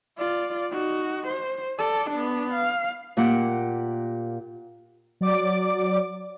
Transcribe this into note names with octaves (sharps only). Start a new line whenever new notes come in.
F4 D5
D#4 F#4
C5
A4 D5
B3 D4
F5
A#2 A#3 G4 F#5
F#3 D5 D6